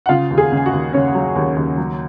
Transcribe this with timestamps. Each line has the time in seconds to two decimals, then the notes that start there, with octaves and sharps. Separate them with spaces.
0.06 F#5
0.09 C#3 F4 F5
0.31 D#2
0.38 G#4 G#5
0.52 C#3
0.57 G#5
0.66 F#4 F#5
0.73 D#2
0.93 C#3 C#4 C#5
1.15 F#3
1.36 D#2
1.56 D#2
1.77 F#3